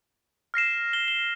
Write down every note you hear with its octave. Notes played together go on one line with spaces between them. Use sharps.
F6 A#6 C7 E7
A#6 G7
G7